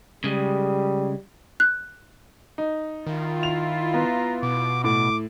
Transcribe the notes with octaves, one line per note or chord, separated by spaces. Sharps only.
C#3 G3 G#3
F#6
D#4
D#3 E4 F4
F7
B3 A#5
B2 D6
A2 D6